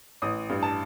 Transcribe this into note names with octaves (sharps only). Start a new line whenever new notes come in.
A1 D#6
G2
A5